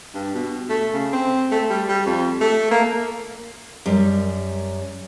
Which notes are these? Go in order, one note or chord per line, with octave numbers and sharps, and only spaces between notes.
G2
B2
A3
C#3
C4
A3
G3
G3
F2
A3
A#3
F#2 G3